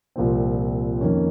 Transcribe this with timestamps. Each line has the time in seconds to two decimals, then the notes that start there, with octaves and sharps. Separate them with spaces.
0.16 C2 A#2 F3 C4
1.01 F2 D#3 A#3 C#4